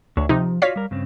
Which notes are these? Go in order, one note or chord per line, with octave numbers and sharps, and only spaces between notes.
D2 D3 D4 C#5
C3 F3 D#4
F4 F#4 C#5 D5 F5 B6
G3 A#4
G2 C#3 C4